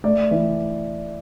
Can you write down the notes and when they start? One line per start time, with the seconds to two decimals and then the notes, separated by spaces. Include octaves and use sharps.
0.04 A3 D5
0.31 E3